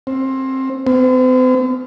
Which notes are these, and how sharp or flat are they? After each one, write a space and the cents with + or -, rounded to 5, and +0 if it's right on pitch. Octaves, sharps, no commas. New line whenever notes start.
C4 +20
C4 -45